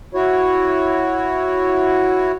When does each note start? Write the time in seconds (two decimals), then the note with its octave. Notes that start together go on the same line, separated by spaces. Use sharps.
0.15 E4 F#4 C#5